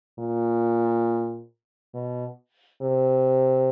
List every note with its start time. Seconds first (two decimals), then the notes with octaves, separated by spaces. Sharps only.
0.19 A#2
1.94 B2
2.82 C3